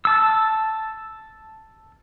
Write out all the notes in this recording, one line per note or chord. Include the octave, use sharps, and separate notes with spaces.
A5 E6